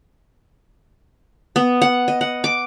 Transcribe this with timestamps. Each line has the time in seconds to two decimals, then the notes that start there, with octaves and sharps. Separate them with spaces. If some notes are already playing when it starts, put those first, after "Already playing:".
1.56 B3
1.82 F#5
2.08 D#5
2.21 F#5
2.44 D6